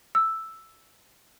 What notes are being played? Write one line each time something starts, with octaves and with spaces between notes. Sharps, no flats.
E6